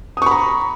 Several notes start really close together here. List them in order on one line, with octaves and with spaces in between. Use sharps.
D#6 C#6 B5 A#5